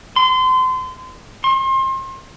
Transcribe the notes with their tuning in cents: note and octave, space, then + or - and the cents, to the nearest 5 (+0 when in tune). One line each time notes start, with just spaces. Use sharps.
C6 -30
C6 +35